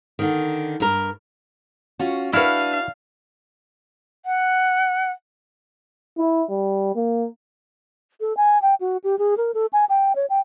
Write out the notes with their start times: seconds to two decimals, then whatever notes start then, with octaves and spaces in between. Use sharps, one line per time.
0.19 D3 D#3
0.80 G2 A#4
1.99 C#4 F4 F#4
2.33 D4 E4 F#4 B4 F5 F6
4.25 F#5
6.18 E4
6.50 G3
6.95 A#3
8.21 A4
8.37 G#5
8.62 G5
8.81 F#4
9.04 G4
9.19 G#4
9.37 A#4
9.54 A4
9.73 G#5
9.89 G5
10.16 C#5
10.30 G5